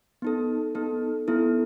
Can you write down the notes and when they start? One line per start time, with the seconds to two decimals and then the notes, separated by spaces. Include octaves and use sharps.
0.22 B3 D#4 A4
0.75 B3 D#4 A4
1.28 B3 E4 A4